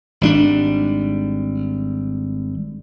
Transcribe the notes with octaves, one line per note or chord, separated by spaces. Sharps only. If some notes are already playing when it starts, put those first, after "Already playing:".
G#1 G3 D4